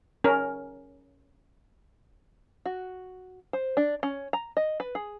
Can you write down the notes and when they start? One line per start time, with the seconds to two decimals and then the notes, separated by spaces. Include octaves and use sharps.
0.24 C#4 A#4
2.65 F#4
3.53 C5
3.77 D4
4.03 C#4
4.33 A#5
4.57 D#5
4.80 B4
4.95 G#4